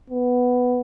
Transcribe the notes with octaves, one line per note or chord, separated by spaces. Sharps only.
B3